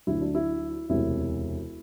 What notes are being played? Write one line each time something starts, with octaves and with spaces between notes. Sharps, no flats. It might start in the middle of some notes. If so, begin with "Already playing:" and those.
D2 D3 F#3 E4
D4
E4
E1 D2 C3 E4